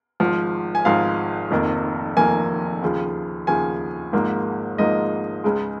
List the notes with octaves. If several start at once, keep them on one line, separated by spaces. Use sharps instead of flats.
G#1 G#2 F3
G#5
G#1 G#2 F3 F5
F1 F2 D#3 A#3
F1 F2 D#3 A#3 G#5
D#2 C#3 F3
D#2 C#3 F3 G#5
G#1 G#2 F3 A#3
G#1 G#2 F3 A#3 D#5
C#2 C#3 G#3